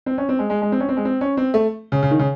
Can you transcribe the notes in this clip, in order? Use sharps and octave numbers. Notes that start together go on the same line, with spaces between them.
C4
C#4
C4
G#3
G#3
G#3
C4
C#4
C4
G#3
C4
C#4
C4
A3
C#3
C#3
D#3
C#3